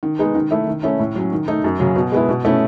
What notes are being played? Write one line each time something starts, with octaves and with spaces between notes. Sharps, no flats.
D#3
G#3 B3 D#4
D#3
A3 E4
D#3
A3 C#4 E4
A2
F#3 C#4
D#3
A3 D#4
F#2
C#3 F#3
B2
G#3 B3 E4
B2
A3 C#4 E4